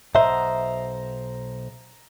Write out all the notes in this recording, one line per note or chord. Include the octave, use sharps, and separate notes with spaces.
B1 C5 D#5 E5 F#5 A#5